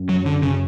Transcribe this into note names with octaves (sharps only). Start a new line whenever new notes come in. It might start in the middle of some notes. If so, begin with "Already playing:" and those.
Already playing: F#2
F#3
D3
C#3